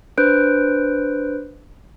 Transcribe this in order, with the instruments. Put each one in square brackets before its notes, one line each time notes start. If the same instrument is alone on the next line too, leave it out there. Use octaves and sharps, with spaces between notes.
[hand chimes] D4 B4 C5 F#6 G6 D7